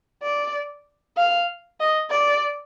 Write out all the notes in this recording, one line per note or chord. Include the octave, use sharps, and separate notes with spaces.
D5
F5
D#5
D5